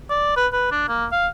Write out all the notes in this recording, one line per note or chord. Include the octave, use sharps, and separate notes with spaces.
D5
B4
B4
D4
A#3
F5